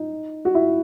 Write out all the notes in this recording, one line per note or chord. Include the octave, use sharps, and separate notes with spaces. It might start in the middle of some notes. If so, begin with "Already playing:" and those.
Already playing: D#4
F#4
E4